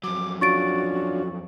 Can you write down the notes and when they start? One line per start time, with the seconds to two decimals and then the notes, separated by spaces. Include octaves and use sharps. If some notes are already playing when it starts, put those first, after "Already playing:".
0.04 F2 F#3 D6
0.41 C#4 D4 F4 F#4 C#6 A6 D7